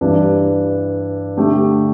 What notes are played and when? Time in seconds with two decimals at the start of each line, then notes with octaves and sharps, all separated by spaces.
0.01 G2 E3 G3 D4
1.37 D3 A3 G4